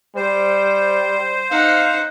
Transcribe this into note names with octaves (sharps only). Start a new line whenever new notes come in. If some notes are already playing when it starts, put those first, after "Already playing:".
G3 C5
D#4 F5 F#5